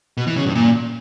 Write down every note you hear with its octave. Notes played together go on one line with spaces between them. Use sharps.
B2
E3
C#3
G2
A#2